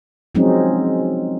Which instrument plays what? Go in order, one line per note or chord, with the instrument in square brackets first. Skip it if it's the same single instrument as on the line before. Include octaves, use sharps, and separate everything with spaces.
[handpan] F3 F#3 G#3 C4 C#4 D#4